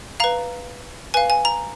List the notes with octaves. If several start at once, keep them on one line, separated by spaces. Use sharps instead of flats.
B4 F5 A#5
B4 F5 G#5
G#5
A#5